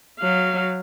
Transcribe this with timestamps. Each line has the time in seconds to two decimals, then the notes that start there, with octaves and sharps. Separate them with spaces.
0.19 F#3 F5